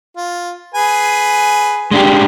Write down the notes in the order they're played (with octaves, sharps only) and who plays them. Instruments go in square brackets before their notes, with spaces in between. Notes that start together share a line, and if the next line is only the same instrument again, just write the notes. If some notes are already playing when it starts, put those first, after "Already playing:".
[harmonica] F4
G#4 B4 G#5
[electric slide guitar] G#3 D4 G4